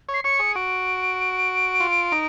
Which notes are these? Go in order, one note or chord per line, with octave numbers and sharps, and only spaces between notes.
C#5
C7
C#5 C#7
G#4
F#4 D7
F4
D#4